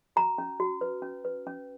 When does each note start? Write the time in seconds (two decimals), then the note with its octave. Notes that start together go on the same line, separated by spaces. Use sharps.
0.16 F#4 A#5
0.38 C#4
0.60 F#4
0.81 B4
1.02 C#4
1.25 B4
1.47 C#4